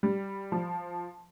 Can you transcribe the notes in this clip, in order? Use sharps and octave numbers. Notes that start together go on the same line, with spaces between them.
G3
F3